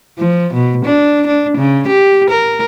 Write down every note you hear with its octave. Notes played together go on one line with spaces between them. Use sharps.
F3
B2
D4
D4
C#3
G4
A#4